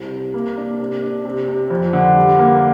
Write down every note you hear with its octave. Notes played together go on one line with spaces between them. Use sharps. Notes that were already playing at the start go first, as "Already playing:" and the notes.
Already playing: C2 C3
C3
A#3
D4
C3
D4
C3
C3
F2
D3
G3
A#3